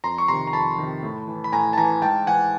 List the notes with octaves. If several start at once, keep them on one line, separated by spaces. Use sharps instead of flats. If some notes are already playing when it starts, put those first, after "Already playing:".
F2 A#5 C6
C#6
C3 D#3 A#5 C6
A#5
F2 A5 B5
C3 D#3
A2
E3
B5
A2 G#5 A#5
A5
E3 G#5 A#5
G#2 G5 A5
E3 F#5 G#5